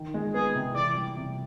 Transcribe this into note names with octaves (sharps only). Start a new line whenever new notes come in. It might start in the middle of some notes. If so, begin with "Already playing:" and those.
Already playing: D#3
G#3
B3 G#4
C3
E3 D5
G3
C3